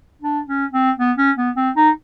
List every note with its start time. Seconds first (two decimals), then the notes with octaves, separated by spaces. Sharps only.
0.22 D4
0.47 C#4
0.73 C4
0.98 B3
1.18 C#4
1.37 B3
1.56 C4
1.76 D#4